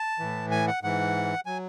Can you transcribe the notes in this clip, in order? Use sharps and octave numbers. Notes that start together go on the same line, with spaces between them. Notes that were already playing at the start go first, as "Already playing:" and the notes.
Already playing: A5
A2 E3
G#5
F#5
G#2 E3 F#5
F#3 G#5